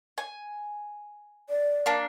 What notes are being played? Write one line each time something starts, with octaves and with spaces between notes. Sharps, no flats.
G#5
D5
A#3 D4